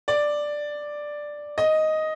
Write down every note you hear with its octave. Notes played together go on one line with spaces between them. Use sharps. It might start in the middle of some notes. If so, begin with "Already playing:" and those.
D5
D#5